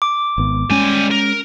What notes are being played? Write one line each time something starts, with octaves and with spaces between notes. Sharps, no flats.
D6
G#1 B3
G3 G#3 C#4 G#5
A#4